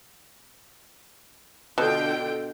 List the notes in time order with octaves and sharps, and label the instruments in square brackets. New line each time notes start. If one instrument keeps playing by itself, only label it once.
[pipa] B2 [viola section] D3 F4 G5